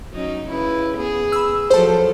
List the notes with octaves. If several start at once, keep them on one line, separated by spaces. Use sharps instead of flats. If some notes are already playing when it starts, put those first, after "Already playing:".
F#3 C#4 D#4
C#3 E4 B4
B3 G#4
B5 E6
F3 F#3 A4 C5 A5